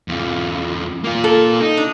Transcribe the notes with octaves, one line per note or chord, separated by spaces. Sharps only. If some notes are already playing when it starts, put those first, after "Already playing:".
E2 F4
A#3 F4
A4
D#4
D4